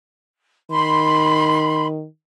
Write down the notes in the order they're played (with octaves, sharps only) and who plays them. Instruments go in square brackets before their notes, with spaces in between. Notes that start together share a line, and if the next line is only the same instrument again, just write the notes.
[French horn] D#3 [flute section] B5 C6